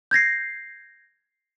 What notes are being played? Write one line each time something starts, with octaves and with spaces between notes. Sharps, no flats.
G6 G#6 A#6 C7